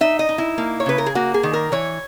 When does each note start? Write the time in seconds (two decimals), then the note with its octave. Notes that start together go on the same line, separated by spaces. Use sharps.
0.01 D#4 E5
0.19 D#5
0.29 D#4
0.38 E4
0.58 A#3
0.80 C#5
0.86 C#3 B4
0.98 A#4
1.06 G#4
1.15 A#3 F#4
1.34 G#4
1.43 D#3
1.53 A#4
1.72 E3 C#5